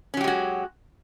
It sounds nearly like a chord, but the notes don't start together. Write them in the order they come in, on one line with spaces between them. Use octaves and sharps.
C#4 F#3 G4 G#3 F#4